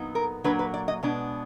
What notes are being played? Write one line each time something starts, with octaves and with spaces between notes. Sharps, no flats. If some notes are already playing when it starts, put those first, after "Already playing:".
Already playing: A#2 F#3 B3 D#4
A#4
A#2 F#3 A#3 D4 B4
B4
D5
D#5
B2 G#3 B3 D4